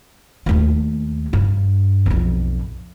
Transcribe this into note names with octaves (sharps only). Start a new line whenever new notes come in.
D#2 A3
G2
B1 F2